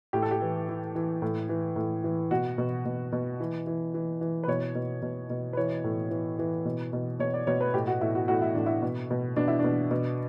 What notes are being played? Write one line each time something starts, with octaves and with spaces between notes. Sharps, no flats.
A2 G4
A4
G4
E3
E3
E3
A2
E3
A2
E3
B2 F#4
B2
B2
B2
E3
E3
E3
E3
B4
B2 C#5
B2
B2
B2
B4
E3 C#5
A2
E3
E3
B2
B2
B2 C#5
D5
B2 C#5
B4
A2 G4
F#4
A2 E4
F#4
A2 F#4
E4
A2 D4
E4
B2
B2
B2 D4
E4
B2 D4
B2